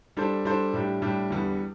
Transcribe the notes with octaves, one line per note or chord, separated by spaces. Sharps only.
G3 D4 A4 C5
G3 D4 A4 C5
A2 G3 D4 G4
A2 G3 D4 G4
E2 D3 G3